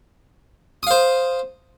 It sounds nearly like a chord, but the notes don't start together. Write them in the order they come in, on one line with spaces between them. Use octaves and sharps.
D#6 F5 C5